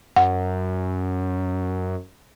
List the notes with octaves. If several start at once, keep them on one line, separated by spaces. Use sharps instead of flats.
F#2 F#5